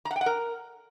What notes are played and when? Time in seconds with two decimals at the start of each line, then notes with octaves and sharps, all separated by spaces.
0.05 A#5
0.11 F#5
0.16 G5
0.21 F#5
0.26 A#4